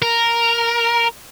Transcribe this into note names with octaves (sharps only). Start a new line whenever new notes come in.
A#4